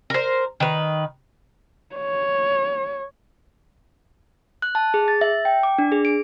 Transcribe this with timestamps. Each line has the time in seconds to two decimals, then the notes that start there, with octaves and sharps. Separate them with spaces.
0.10 A#4 C5
0.60 D#3 B4
1.95 C#5
4.62 F#6
4.75 A5
4.94 G#4
5.08 A6
5.21 E5
5.45 G5
5.63 D6
5.78 D4
5.92 G#4
6.05 D7